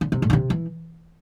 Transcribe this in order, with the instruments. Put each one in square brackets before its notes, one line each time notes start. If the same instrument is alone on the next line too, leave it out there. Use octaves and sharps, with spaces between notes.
[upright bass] D3
C3
A2
D3
C3
E3